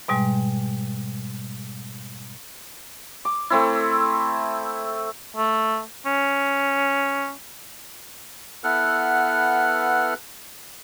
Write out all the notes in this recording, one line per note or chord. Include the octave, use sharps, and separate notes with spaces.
G#2 B2 G3 G#3
D6
A3 C4 E4
A3
C#4
B3 E4 A4 B4 F#5 F6